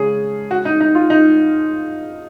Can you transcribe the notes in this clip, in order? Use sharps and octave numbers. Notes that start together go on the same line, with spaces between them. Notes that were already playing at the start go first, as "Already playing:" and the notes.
Already playing: C#3 G#3 C#4 G#4
F#4
D#4
D#4
F4
D#4